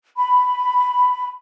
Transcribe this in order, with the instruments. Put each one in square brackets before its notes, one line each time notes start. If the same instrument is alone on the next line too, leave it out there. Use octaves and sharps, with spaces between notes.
[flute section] B5